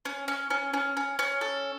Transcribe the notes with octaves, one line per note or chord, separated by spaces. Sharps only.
C#4
C#4
C#4
C#4
C#4
C#4
A4